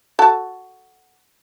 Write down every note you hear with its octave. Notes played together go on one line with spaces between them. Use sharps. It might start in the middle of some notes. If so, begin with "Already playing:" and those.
F#4 A4 A5